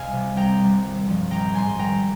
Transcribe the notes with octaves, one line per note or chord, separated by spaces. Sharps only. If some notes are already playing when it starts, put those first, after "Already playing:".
Already playing: C2 D#5 F5 G#5
C3 G3
C2 G5 A#5
C3 G3
G#1
G2 F3
A#1 G5 A#5
G#2 G3 G#5 C6
G#1 G5 A#5